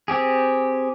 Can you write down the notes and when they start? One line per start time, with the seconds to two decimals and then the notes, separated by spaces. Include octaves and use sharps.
0.08 C4 G4 G#4